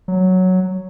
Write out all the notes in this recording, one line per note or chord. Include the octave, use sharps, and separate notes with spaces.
F#3